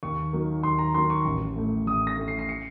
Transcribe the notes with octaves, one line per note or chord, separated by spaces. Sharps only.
D#2 C#6
D#3 F#3 A#3
D#2 C6
A#5
D#3 F#3 A#3 C6
C#6
A1
A2 A3
A1 D#6
A#6
A2 A3
C7
C7
C#7